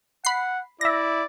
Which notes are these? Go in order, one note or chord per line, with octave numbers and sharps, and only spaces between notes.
F#5 B5 C7
E4 D5 E5 A#6